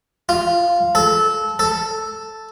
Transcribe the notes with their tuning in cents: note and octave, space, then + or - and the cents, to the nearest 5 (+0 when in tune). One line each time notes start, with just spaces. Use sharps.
F4 -5
A4 -20
A4 +0